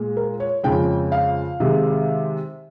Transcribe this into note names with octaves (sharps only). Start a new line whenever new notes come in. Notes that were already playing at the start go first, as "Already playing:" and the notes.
Already playing: A#2 G#3
A#4
C#5
F2 C#3 G#3 G5
F5
C3 D#3 G#3